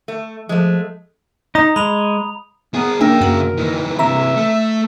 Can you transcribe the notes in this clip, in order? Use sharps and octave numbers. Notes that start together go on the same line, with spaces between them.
A3
F3 G#3 A3
D#4 A#5 D#6
G#3 B5 F7
B3 G#4 A#4
C#3 A#3 D4 A#4 E5 G5
F#2 A#3 F#4
D#3 E3
C3 E3 E5 A#5
A3